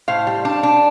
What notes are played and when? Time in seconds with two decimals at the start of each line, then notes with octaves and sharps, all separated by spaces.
0.08 A2 C5 F5
0.27 G3
0.45 D4
0.63 D4